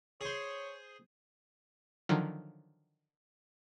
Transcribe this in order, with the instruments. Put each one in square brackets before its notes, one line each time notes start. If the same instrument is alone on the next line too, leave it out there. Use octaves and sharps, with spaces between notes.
[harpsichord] G#4 C5 [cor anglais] C#5
[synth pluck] D3 D#3 F3 F#3